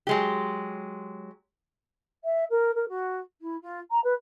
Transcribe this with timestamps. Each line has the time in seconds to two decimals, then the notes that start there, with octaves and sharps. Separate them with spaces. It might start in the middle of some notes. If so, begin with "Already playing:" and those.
0.07 F#3 G#3 G4
2.24 E5
2.50 A#4
2.75 A#4
2.88 F#4
3.41 E4
3.62 F4
3.91 A#5
4.04 B4